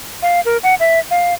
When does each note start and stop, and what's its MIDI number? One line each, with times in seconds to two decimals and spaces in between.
0.22 0.41 77
0.45 0.57 70
0.63 0.75 78
0.80 0.99 76
1.11 1.34 77